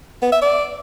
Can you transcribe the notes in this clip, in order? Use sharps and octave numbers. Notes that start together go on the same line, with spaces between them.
B3
E5
D5